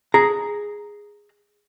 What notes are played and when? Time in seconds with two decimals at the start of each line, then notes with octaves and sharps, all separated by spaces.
0.14 G#4 A#5